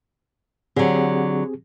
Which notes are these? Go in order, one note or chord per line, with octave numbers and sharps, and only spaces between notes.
D3 F#3 C4 G4 G#4